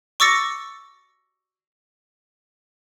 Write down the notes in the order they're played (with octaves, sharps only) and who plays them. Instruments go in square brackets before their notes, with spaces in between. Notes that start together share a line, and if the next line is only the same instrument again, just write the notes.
[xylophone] C#6 D6 E6 A6 A#6 C#7